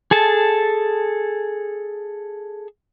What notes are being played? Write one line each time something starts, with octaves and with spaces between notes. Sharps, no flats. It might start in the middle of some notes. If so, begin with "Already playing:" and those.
G#4 A4 A5